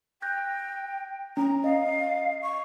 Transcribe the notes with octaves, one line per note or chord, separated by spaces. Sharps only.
G5 F#6 G6 A#6
C#4 A#5
D#5 F5
C#6